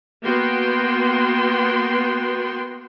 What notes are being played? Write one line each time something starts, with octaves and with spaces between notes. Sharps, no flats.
A#3 B3 F#4 G5 C6